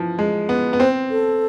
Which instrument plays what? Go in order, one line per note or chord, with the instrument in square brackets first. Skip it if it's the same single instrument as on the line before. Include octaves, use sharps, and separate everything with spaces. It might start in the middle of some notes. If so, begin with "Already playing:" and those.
Already playing: [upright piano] E3 F3
G#3
B3
B3
[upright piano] C4 [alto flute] C5
[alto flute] A4